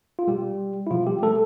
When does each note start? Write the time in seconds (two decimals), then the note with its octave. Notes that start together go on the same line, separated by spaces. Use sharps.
0.19 F4
0.28 B2 G3 G4
0.87 E4
0.91 B2 F3 F4
1.06 G3 G4
1.23 A3 A4